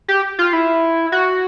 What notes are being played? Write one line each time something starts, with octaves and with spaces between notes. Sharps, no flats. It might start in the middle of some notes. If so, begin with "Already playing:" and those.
G4
F4
E4
F#4